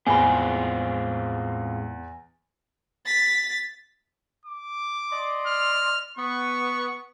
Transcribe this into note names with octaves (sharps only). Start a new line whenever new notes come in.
E2 A2 G#3 C4 F4 G#5 B5
A6 B6
D6
D5 D#5 C6
F6
B3 C#6